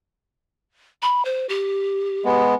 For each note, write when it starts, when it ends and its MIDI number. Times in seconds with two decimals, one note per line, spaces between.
1.02 1.23 83
1.25 1.46 72
1.49 2.41 67
2.25 2.55 56
2.25 2.55 59